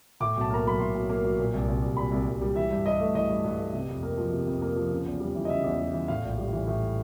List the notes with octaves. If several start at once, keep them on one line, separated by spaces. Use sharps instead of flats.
A2 D6
B1
A5
A#3 A#5
F#3 B5
A2 C6
B1
A#3
F#3
A#2
C2
C2
G3
A#2 B5
C2
C2
G3
E3 E5
G2
G2 D#5
A3
E3 D#5
G2
G2
A3
C3
F2
A#3
F3
C3
F2
A#3
F3
C#3
E2
G3
E3
D#5
C#3 E5
E2
G3
E3
A2 F5
A#1
G3
E3
A2